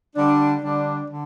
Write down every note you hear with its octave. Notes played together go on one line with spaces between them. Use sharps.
D3 G3 D4
D3 G3 D4
D3